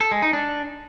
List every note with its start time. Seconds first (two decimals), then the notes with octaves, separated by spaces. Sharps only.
0.01 A4
0.11 G#3
0.22 D#4
0.33 D4